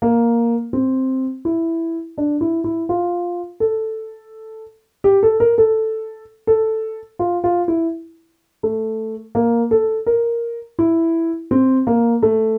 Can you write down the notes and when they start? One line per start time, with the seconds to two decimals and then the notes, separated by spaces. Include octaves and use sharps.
0.02 A#3
0.73 C4
1.45 E4
2.18 D4
2.41 E4
2.64 E4
2.89 F4
3.60 A4
5.04 G4
5.23 A4
5.40 A#4
5.58 A4
6.47 A4
7.19 F4
7.44 F4
7.68 E4
8.63 A3
9.35 A#3
9.71 A4
10.06 A#4
10.79 E4
11.51 C4
11.87 A#3
12.23 A3